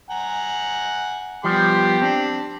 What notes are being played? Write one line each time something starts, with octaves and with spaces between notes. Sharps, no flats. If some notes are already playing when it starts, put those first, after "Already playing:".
F#5 G#5 A#5
F3 G3 B3 G4 C6 D6
C4 D4